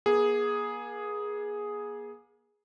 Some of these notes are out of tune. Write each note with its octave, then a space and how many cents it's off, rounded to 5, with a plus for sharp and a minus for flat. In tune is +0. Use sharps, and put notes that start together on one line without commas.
A#3 +40 G#4 +0